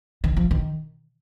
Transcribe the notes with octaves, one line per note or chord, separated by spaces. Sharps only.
D#3
F3
D#3